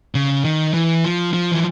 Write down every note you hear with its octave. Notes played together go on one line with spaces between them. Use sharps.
C#3
D#3
E3
F3
F3
E3